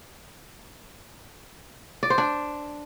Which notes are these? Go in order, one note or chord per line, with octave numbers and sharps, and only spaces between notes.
D5
C5
D4